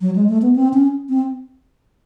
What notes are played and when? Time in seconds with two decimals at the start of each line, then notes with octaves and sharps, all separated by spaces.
0.01 F#3
0.16 G#3
0.29 A3
0.42 B3
0.56 C4
0.73 C#4
1.09 C4